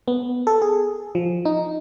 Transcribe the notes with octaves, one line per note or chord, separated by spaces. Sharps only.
B3
A4
G#4
F3
D#4